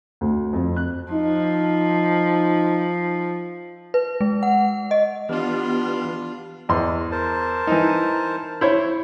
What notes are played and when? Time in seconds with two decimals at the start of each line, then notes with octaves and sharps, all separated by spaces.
0.21 D2
0.53 F2
0.76 F#6
1.12 F3 D#4
3.94 B4
4.21 G#3
4.43 F#5
4.91 D#5
5.29 E3 B3 D4 F4 G4 F6
6.69 E2 D#5 C6
7.11 A#4 C5 A5
7.67 E3 D#4
8.61 E4 C5 C#5